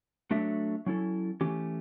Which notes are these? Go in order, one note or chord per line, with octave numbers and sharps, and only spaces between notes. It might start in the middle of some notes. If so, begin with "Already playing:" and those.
F#3 A3 D4 A4 E5
F#3 C#4 E4 A4
E3 A3 C#4 G4